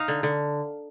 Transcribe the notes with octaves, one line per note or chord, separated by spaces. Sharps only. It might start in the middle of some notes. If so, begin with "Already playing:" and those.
Already playing: D#4 F5
D3
D3